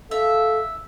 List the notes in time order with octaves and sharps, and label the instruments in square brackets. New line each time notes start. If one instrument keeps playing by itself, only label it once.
[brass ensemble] A4 F5 [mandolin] E5